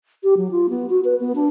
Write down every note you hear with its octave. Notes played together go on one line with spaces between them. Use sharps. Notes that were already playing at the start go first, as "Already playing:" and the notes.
G4
F#3
F4
B3
F#4
B4
B3
D4